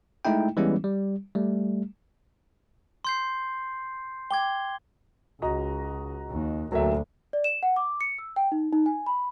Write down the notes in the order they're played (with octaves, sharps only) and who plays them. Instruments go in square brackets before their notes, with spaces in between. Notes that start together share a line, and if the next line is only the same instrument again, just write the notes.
[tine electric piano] G#3 A3 D#4 E4 G5
E3 G3 G#3 B3 C#4 E4
G3
G3 A3
[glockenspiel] C6 G6 C7
[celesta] G5 D6 [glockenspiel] G#6 G7
[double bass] C#2 [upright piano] F#4 D#5 A#5
[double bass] D#2
[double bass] D2 [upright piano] F#3 A#3 E5
[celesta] D5
E7
F#5
D6
C#7
E6
G5
D#4
D#4
G#5
B5